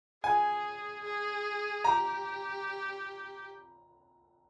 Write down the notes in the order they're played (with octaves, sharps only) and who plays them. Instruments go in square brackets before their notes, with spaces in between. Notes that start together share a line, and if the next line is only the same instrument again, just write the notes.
[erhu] G#4 [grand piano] G#5
[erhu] G#4
[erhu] G4 [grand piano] A#5